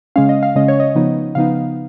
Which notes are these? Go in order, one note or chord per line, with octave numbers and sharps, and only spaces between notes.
C#3 G#3 C#4 F5
D#5
F5
C#3 G#3 C#4 D#5
C#5
D#5
C#3 F3 B3 D#4
C#3 F3 B3 D#4 F5